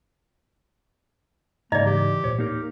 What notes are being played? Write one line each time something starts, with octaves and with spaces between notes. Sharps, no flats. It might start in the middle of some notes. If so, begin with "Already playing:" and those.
G#2 C#3 A#3 D5 D#5 A#5
E3 G4
D#2 A#2 C5 C#5
A2 A#3 D#4 G4 A#4